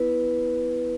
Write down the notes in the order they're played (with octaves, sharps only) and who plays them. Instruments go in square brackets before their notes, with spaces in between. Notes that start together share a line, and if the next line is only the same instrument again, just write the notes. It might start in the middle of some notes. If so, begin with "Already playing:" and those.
Already playing: [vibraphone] B3 E4 B4